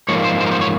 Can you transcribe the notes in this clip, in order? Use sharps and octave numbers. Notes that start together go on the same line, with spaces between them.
G#2 F3 A#3 C#5
C5
C5
A#4
C5
C#5